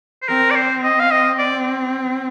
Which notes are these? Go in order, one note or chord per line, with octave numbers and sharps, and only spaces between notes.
C5
C4 A#4
D5
C5
D#5
F5
C4 D#5
D5